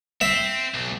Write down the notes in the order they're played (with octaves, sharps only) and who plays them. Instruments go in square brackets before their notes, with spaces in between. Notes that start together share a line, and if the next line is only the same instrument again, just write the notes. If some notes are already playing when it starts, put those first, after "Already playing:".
[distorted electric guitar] C4 [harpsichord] E5
[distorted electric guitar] B1